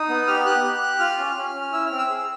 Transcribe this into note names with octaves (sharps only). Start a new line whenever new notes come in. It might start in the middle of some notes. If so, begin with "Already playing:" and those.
Already playing: D#4 D#6
B3
G4 F6
G4 F#6
G4
G4
F4 F6
C#4
C#4
C#4
E4 E6
F6
C4
E6
G#4